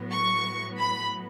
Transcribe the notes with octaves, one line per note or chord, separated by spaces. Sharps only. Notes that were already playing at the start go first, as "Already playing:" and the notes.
Already playing: A2 F#3 B3
C#6
B5